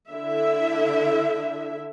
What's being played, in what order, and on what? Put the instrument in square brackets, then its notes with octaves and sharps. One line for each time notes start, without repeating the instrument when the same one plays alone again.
[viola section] D3 E4 E5